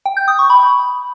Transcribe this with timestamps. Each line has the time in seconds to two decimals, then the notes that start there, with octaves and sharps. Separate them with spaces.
0.06 G5
0.17 G6
0.28 D#6
0.39 C#6
0.50 B5